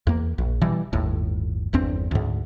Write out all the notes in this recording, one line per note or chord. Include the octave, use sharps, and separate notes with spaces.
E2 A#3
A#1
B2 E3 G3
G1 D#2 A2
G1 E2 C4 D4
D2 G#2